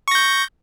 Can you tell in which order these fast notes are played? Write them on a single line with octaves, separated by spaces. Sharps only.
C#6 A#6 G6